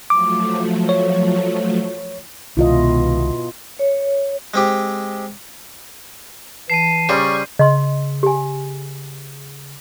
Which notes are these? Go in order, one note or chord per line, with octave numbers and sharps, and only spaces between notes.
F3 F#3 A3 D6
C#5
C2 B2 D#3 G#3 E4 F4 D#5
C#5
G#3 C4 G4
E3 A5 C7 D#7
C#3 G3 C5 D5 C#6
C#3 D#5 C6
G4 G#5